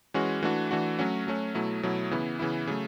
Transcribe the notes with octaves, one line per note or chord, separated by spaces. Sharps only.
E3 G#3 C#4 F#4
E3 A3 D4 F#4
E3 A3 D4 F#4
F#3 A3 C#4 F#4
F#3 A3 C#4 F#4
B2 F#3 A3 E4
B2 F#3 A3 E4
C#3 E3 B3 E4
C#3 E3 B3 E4
C#3 F#3 A3